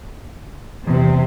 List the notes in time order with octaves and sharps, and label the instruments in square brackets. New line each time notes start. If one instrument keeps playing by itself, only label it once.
[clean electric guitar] E2 [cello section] C3